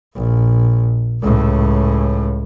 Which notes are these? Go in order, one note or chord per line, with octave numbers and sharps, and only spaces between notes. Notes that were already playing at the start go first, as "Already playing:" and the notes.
A#1
C#2 A2